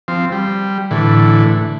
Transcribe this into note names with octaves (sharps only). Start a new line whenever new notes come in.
F3 C4
G3
A2 D3 E3